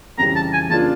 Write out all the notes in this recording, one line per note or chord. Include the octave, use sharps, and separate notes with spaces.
F2 C#3 E3 G3 A#5
A5
G#5
C#3 F3 A#3 D4 F4 A5